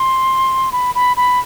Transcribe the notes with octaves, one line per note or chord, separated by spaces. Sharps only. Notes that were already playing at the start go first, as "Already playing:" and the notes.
Already playing: C6
B5
B5
B5